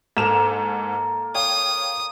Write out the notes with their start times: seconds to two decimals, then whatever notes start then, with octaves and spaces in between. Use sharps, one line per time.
0.17 G#2 A#3 A4 A#4 E7 F7
1.35 C#5 F5 G5 D#6